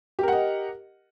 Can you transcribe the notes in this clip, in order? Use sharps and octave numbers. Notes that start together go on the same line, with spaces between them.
G4 A#4 D#5 F#5